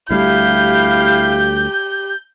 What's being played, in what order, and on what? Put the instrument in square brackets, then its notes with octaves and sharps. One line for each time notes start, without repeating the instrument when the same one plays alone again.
[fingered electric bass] D2 G3 A3 [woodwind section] E4 F5 [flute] G4 [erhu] G6